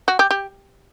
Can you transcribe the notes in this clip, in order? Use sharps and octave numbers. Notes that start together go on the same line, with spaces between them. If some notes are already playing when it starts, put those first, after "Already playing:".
F#4
G4
G4